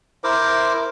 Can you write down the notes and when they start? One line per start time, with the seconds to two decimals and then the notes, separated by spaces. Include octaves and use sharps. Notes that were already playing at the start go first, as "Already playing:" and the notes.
0.24 E4 A#4 C5 D6